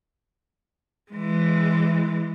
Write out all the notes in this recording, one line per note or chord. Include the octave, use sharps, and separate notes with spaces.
E3 G#3